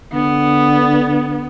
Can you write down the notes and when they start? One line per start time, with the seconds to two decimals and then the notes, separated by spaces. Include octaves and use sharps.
0.13 D3 B3